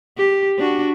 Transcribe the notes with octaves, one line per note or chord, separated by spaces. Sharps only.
G4
D4 F#4